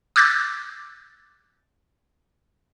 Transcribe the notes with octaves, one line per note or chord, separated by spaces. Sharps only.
D6 E6 F#6 G6 A6